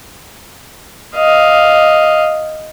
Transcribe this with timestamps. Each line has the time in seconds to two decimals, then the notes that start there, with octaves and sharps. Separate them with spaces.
1.16 D#5 F5